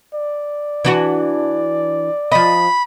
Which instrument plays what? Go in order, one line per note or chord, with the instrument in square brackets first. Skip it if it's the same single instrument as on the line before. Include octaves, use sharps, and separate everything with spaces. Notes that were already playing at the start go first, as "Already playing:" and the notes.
[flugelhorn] D5
[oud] E3 D4 F#4
[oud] F3 D#5 [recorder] B5